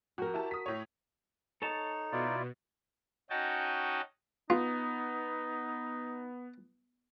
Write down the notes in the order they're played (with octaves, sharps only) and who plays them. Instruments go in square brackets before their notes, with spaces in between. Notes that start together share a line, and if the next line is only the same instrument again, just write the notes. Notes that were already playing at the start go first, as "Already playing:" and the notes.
[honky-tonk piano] F2 [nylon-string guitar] F#4 A#4
[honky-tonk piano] E4 G4 A5
D#6 B6
A2 C#5
[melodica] D#4 [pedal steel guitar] A4 C#5 A5
[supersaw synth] B2 [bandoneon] E4 F4 D5
[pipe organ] C#4 D#4 F#4 D#5 G5 A5
[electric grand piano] B3 [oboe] D#4 [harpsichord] F4